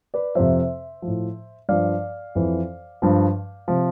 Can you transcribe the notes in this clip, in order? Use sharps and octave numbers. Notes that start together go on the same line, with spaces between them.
B4 D5
F2 C3 F3 C5 E5
A2 F3
G2 F3 D5 F5
F2 E3
G2 F3
C3 F3